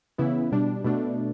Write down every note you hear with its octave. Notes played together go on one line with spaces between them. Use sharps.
C#3 E3 B3 E4
B2 G3 D4
B2 A3 D4